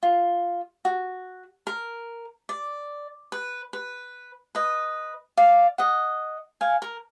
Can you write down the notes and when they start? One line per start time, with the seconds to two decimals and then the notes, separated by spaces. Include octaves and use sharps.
0.03 F4
0.85 F#4
1.67 A#4
2.49 D5
3.32 B4
3.73 B4
4.55 B4 D#5
5.37 D5 F5
5.78 D#5 F#5
6.61 F5 G#5
6.82 A#4